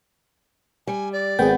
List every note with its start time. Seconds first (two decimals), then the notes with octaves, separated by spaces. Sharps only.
0.87 G3 G#5
1.13 D5
1.39 G#1 B3 G#4 G5